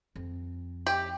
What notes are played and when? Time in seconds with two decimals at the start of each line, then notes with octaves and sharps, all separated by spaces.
0.16 F2
0.87 G4